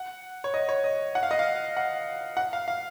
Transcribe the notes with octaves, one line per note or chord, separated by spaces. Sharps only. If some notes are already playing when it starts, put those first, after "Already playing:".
Already playing: F#5
C#5
D#5
C#5
D#5
F#5
F5
D#5
F5
F#5
F#5
F5
F5